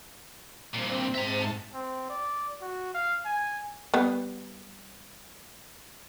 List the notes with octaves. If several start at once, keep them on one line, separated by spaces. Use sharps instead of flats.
G2 A#2 C4
G#2 E5 A5 A#5
C4
D5
F#4
F5
G#5
G3 B3